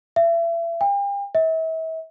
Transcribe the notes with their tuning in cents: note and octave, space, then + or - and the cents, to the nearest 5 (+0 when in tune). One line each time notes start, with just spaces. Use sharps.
E5 +35
G5 +40
E5 -40